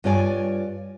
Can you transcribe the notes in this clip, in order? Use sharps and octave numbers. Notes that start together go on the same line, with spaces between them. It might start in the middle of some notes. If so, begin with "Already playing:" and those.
G2 F4 C#5 D5 G#5